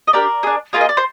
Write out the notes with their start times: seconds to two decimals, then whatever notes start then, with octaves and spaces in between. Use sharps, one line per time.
0.07 D#5
0.13 D4 G4 A#4 D5
0.43 D4 G#4
0.73 A#3 F4 G#4 F5
0.81 D#5
0.89 D5
0.97 C5